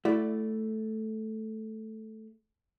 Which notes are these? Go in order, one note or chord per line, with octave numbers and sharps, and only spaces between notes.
A3 E4 F#4 D5